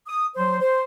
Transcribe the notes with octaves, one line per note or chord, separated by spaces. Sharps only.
D#6
F#3 C5
C5